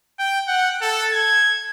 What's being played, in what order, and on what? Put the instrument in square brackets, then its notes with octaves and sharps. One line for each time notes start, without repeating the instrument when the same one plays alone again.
[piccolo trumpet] G5
F#5
A4
G#6